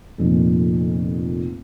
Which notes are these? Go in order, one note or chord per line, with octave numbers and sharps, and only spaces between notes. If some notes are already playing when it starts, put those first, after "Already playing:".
F1 F2 A#2